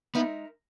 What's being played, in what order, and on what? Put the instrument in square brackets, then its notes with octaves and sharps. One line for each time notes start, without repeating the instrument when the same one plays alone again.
[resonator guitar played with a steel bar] G#3 D#4 A#4 E5 [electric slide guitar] B3